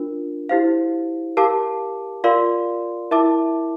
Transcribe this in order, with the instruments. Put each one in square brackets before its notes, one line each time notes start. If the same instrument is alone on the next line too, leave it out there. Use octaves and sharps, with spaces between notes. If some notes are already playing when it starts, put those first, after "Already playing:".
Already playing: [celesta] D4 F4 A#4
E4 G4 C5 F5
G4 A#4 F5 A5 D6
F4 A#4 D5 F5 C6
E4 A#4 E5 A5 D6